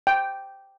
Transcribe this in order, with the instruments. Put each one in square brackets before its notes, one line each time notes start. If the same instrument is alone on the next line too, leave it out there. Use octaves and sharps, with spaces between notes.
[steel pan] G5